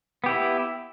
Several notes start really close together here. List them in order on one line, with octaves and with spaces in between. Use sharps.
B3 G4 E4